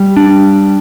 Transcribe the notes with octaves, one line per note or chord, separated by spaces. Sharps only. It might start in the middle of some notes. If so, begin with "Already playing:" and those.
Already playing: G3
D4